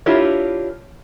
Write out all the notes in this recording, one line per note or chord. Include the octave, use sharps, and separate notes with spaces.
D4 E4 F4 G4 A#4 C#5